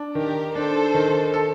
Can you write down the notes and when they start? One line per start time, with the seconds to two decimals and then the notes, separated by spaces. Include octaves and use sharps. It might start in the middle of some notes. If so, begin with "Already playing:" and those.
Already playing: D4
0.15 D#3 G4 A#4
0.55 D4 A4 C5
0.94 D#3
1.34 A4